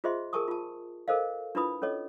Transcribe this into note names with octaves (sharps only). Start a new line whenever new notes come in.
F4 G#4 C5 D#5 E5 C6
G#4 A#4 G#5 A5 C#6 D#6
F4 A5
A4 A#4 C5 D#5 F5
D4 E4 F4 B4 B5 D#6
C#4 A4 C#5 D#5